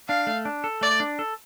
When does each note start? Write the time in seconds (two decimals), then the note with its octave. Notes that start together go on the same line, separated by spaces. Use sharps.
0.08 D4 F5
0.27 A3
0.45 D4
0.64 A4
0.81 A3 D5
1.00 D4
1.19 A4